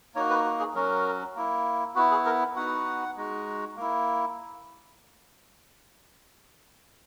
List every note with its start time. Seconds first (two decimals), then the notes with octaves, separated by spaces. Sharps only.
0.15 A#3 D#4 F#4 C#5
0.30 B4
0.45 F#4
0.59 G#4
0.75 F#3 C#4 F#4 A#4
1.36 A#3 E4
1.95 B3 F#4
1.98 E4
2.11 G#4
2.26 A#4
2.56 B3 D#4 F#4 F#5
3.17 G#3 D#4 F#4
3.76 A#3 E4